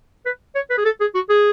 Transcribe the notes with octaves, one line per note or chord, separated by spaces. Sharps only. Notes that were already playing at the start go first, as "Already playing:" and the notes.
B4
C#5
B4
G#4
A4
G#4
F#4
G#4